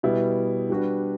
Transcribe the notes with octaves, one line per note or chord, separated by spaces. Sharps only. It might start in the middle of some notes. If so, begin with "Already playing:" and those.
B2 G3 B3 E4
G3 D4 F#4 B4